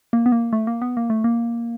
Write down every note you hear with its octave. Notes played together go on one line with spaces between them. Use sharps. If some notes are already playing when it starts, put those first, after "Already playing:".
A#3
B3
A#3
A3
A#3
B3
A#3
A3
A#3